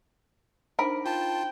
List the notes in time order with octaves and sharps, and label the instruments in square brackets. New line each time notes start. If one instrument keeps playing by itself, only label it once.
[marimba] D4 D#4 C5 [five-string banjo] A#4 B5
[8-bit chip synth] F4 A5 [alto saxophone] G5